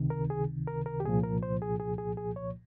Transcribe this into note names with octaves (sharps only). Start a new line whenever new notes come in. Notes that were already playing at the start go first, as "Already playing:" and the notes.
Already playing: C#2 C3 D#3
A#4
G#4
A#4
A#4
G4
C2 A#2 F3 G#4
A#4
C5
G#4
G#4
G#4
G#4
C#5